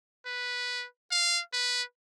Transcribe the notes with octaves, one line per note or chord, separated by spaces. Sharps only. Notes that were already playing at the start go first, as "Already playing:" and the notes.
B4
F5
B4